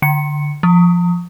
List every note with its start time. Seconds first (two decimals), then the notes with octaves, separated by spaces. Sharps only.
0.02 D3 C#7
0.63 F3